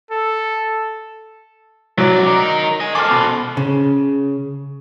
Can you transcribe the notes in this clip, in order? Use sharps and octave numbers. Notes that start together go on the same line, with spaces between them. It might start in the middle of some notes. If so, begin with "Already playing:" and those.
A4
F#2 F#3 D5
D#4 A#4
D#5 G#5
A4 C5 D6 F6
B2
C#3